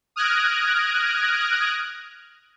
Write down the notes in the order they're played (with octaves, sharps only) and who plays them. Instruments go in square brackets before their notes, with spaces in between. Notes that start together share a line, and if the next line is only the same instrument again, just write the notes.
[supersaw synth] D#6 F6 F#6 G#6 A#6 D7